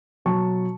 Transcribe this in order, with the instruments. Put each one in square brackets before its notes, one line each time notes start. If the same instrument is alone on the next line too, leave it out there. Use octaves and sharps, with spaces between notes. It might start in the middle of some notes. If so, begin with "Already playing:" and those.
[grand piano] B2 F#3 A5 C#6